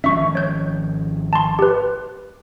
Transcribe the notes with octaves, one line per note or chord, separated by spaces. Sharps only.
G#1 F3 C#4 E5 C#6
C#5 G6
A5 C6
G4 B4